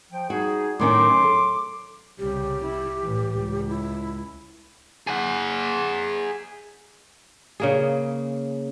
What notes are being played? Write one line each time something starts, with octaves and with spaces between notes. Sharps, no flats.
F3 G5
G3 D#4 F#4 G#4
A2 D#3 F#3 C#4 C6 D6
A4
C2 C#3 G4
E4
A2 E3
C#2
E4
G#4 F#5
C#3 A#3 G#4